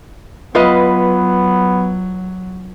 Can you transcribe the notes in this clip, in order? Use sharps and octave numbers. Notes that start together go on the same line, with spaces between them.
F#3 B3 F4 B4 D#5